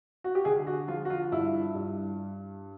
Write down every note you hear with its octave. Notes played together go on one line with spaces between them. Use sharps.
F#4
G4
D3 G#4
F#4
F3 F4
F#4
F4
G2 E4
G2